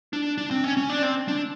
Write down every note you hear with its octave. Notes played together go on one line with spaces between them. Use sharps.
D4
D4
C4
C#4
C#4
D4
C4
D4